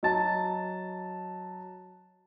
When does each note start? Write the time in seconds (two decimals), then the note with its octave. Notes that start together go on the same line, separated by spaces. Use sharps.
0.03 F#3 D#5 A5 A6